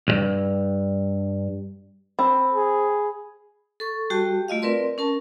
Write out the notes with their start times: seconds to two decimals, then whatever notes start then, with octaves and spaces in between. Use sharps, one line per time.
0.08 B1 G2
2.19 C4 B5
2.53 G#4
3.80 A4 C#6
4.10 G3 F#4 G4 G5 A5
4.48 A3 F4 D#5 F5
4.62 C4 A#4 B4 D5 C6
4.98 C#4 A#4 A5